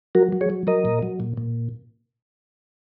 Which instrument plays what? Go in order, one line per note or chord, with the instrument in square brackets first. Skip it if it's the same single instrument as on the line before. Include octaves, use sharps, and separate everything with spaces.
[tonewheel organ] F#3 F#4 A#4
F#3
G#4 C#5
F#3
F#3 A#4 D#5
A#2
F#3
A#2
A#2